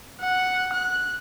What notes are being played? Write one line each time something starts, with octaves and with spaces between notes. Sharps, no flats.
F#5
F#6